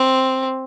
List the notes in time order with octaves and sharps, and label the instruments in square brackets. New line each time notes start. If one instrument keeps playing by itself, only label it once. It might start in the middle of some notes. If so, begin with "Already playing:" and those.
Already playing: [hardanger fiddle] C4